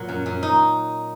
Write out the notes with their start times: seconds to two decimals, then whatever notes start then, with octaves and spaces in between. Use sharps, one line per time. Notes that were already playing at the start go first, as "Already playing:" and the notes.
Already playing: A#2 F#3
0.09 F#2
0.26 F#2
0.43 D#4